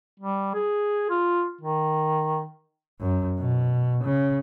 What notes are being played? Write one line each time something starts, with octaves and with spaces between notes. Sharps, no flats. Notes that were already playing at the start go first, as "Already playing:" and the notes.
G3
G#4
F4
D#3
F#2
B2
C#3